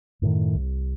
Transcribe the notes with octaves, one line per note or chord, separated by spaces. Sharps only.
F#2 A2 D3 D#3
C2